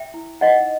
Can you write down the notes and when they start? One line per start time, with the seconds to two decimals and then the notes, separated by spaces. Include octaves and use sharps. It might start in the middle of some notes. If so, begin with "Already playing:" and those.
Already playing: E5 G5
0.14 E4
0.41 D#4 D#5 F#5